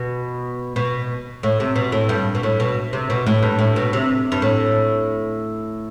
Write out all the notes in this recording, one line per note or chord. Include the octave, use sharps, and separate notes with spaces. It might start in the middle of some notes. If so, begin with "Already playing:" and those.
Already playing: B2
B2
A2
C3
B2
A2
G2
B2
A2
B2
C3
B2
A2
G2
A2
B2
C3
G2
A2